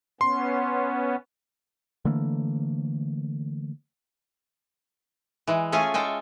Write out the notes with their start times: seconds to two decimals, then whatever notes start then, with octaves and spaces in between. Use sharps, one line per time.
0.21 B3 C#4 C6
2.05 D3 E3 A3 A#3
5.47 E3 G#3
5.72 A3 C#4 F4 G#4 G#5
5.94 G#3 A4 G5 G#5